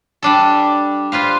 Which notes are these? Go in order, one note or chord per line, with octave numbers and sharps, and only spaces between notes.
G3 D4 A4
F4 B4 C5 F5